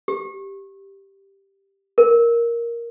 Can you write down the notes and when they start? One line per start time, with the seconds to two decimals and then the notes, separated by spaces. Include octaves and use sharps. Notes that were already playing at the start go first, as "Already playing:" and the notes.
0.08 G4
1.98 A#4